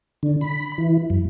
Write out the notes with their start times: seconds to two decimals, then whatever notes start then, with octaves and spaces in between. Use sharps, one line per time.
0.23 D3
0.41 B5
0.78 E3
1.10 F#2